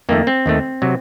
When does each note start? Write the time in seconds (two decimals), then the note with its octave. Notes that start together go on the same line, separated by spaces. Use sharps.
0.09 F2 D#3 A3 A#3
0.27 C4
0.46 D#2 D#3 A3
0.82 C3 F#3